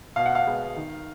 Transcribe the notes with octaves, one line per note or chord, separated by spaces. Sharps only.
B2 F5
F#5
F5
G#3 B3
D#3